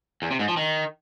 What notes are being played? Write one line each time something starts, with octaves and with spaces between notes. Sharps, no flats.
E2
C3
G#2
F3
D#3